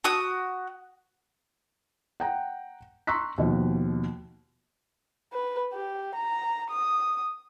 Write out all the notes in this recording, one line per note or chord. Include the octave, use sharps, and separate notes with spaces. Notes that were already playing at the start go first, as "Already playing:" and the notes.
F#4 D#6
F#5 G5 A#5
A#5 C6 C#6 E6 F#6 B6
D#2 B2 F3
B4
G4
A#5
D#6